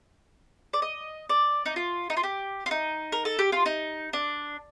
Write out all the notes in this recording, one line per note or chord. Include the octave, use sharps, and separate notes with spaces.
D5
D#5
D5
D#4
F4
D#4
F4
G4
F4
D#4
A#4
A4
G4
F4
D#4
D4